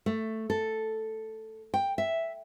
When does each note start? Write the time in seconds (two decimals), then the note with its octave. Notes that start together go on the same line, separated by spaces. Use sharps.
0.06 A3
0.50 A4
1.74 G5
1.98 E5